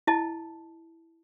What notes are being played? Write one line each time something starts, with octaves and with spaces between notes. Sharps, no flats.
E4 D#5 A5